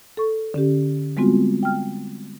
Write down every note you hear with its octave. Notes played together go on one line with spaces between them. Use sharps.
A4 C#6
D3 C#4 G4
G3 G#3 B3 C4 F4 F#4
G5 F6